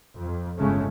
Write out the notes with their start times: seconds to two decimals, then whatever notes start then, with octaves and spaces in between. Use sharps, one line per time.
0.18 F2
0.57 G1 A2 C#3 G#3 A3 C#4